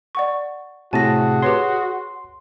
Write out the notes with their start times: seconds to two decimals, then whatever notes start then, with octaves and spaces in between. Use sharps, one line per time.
0.15 D5 F#5 C#6
0.93 A2 C3 F#4 G#4 G#5 A5 A#6
1.42 G4 B4 C#5 C6